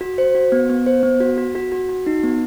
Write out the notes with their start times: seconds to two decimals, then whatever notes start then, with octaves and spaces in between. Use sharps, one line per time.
0.01 F#4
0.18 C5
0.35 F#4
0.52 B3
0.70 B3
0.86 C5
1.03 B3
1.20 F#4
1.38 F#4
1.55 F#4
1.72 F#4
1.89 F#4
2.07 D#4
2.24 B3